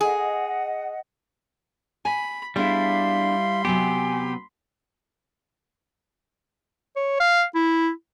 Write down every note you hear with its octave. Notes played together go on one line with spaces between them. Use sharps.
G#4 D#5 F#5
G#5 B5
G3 B3 D4 E4 G#4 F5 B5 C6
C3 F#3 B3 G4 G#5
C#5
F5
E4